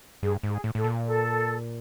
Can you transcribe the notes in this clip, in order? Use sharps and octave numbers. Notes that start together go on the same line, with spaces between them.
G2 G#4
G#2
G#4
A2
A2 A4
A#2
A4